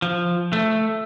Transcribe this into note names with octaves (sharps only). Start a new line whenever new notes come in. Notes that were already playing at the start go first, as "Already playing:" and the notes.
F3
A3